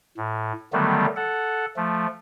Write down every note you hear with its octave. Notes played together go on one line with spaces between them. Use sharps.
A2
D3 D#3 F#3 G3 A3 B3
A4 F#5
F3 A3